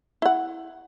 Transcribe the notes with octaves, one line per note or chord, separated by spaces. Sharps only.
E4 F#5